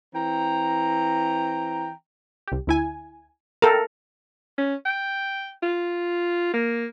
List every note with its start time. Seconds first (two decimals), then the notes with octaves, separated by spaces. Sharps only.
0.14 E3 C4 G5 A#5
2.48 C2 G4
2.67 D2 E4 G#5
3.62 A4 A#4 F5 G5
4.58 C#4
4.85 G5
5.63 F4
6.54 A#3